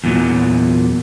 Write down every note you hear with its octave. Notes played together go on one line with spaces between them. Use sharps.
E2 A#2 F#3